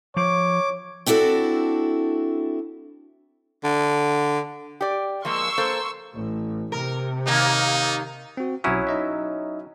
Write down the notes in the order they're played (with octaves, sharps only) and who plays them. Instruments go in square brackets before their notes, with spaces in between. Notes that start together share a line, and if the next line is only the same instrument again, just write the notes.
[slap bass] F3 [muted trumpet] C#5 [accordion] D6
[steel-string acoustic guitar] C4 D4 E4 F#4 A4
[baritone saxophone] D3
[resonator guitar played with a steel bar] G4 D5
[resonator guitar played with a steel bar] F3 G#3 A#3 [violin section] C6 C#6 E6
[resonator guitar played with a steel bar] A#3 A4 C5
[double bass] A1
[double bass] C3 [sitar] A#4
[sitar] D#2 A#3 [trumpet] D#4
[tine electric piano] C4 F#4
[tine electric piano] B1 D#6 [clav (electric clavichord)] F#3 C#4 E4
[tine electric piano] D#4 D#5 E5